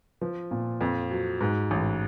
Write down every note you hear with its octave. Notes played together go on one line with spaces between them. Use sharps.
F3
A#2
F2
F#3
G#2
A1